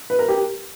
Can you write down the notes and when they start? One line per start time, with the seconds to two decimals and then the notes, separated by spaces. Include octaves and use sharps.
0.10 B4
0.19 A#4
0.28 G4